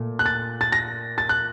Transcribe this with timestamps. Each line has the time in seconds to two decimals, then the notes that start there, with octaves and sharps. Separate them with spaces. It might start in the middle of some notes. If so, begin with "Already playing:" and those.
Already playing: A#2 A3
0.19 F#6
0.26 A6
0.61 A6
0.72 A#6
1.18 A6
1.29 F#6